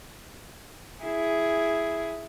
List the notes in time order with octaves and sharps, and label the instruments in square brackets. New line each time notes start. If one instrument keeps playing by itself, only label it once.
[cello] E4 G#4